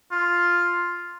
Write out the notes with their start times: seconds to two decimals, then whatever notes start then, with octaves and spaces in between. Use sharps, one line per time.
0.11 F4